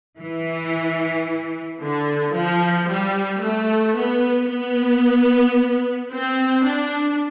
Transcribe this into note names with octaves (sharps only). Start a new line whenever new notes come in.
E3
D3
F3
G3
A3
B3
B3
C4
D4